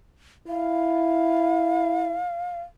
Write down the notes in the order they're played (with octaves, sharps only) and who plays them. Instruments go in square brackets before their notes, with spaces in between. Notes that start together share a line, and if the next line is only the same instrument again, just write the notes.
[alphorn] E4 [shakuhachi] F5